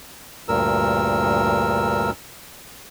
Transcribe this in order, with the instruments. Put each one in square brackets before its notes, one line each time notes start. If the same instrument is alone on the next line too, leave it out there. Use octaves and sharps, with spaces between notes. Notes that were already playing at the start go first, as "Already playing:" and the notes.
[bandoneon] D2 G2 A#2 A#4 E6